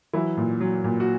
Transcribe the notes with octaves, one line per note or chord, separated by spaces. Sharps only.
E3 F#3 E4
A#2
F#3
A#2
F#4